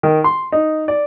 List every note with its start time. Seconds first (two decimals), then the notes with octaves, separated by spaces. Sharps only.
0.03 D#3
0.24 C6
0.52 D#4
0.88 D5